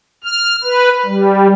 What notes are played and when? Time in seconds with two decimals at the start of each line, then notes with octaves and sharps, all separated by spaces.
0.24 F6
0.64 B4
1.05 G3